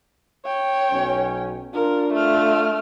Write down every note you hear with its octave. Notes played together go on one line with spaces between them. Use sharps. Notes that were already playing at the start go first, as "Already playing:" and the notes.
C#5 G5
B1 F#3 C#4
D4 F4 A#4
A3 F6